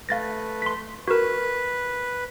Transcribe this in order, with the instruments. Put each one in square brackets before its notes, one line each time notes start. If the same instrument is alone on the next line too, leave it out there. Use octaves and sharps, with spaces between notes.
[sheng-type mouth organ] A3 B4 [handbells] F5 A6 A#6
[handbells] C6 B6
[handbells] F#4 A#4 [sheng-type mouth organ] B4